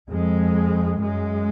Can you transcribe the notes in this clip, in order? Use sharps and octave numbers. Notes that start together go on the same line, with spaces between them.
F2 G#3
F#2 G#3